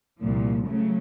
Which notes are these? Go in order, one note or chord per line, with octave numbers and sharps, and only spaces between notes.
C2 A#2 F3
C#3 F#3 A3